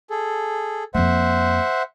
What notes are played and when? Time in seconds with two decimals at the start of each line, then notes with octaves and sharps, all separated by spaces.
0.10 G#4 A4
0.94 F2 A#3 C5 E5 F#5